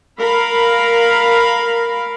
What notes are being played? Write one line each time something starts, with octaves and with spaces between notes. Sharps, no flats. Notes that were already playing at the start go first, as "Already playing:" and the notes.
A#4 F5 B5